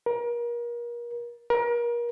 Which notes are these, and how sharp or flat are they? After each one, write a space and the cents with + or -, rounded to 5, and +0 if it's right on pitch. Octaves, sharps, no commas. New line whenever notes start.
A#4 +35
A#4 +35